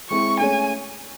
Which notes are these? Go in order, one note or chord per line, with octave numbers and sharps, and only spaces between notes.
G#3 C4 E4 G#4 C#6
A3 C#4 G#4 C#5 G#5